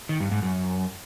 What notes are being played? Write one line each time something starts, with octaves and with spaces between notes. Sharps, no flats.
D#3
G2
G#2
F#2